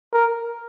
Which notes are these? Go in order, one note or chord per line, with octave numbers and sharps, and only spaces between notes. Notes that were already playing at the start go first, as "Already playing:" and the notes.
A#4